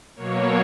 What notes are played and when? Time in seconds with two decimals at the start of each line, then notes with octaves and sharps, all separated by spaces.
0.16 B2 F#3 A#3 C#5